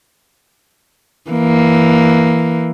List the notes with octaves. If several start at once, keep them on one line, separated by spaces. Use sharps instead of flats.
E3 A#3